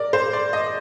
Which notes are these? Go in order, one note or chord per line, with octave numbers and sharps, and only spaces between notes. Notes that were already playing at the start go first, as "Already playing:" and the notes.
Already playing: A#4 D5
C5
D5
D#5